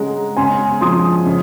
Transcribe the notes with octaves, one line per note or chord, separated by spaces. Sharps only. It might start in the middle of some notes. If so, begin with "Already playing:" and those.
Already playing: C#3 G#3 F#5 A#5
C#3 G#5 C6
F3 C6 D#6
C#3